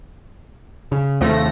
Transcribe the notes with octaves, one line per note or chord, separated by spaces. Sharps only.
C#3
D#2 C3 F3 A3 A#6